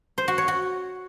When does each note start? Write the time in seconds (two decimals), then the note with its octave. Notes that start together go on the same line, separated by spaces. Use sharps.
0.18 C5
0.28 F#4
0.38 C#5
0.48 F#4